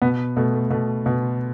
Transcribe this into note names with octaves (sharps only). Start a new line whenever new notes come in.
B2 B3
B2 A3
A3
B2 A3
B2